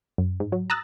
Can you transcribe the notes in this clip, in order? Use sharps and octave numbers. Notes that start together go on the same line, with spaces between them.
F#2
G#2
F#3
A#5 D#6 E6 F#6 A6 A#6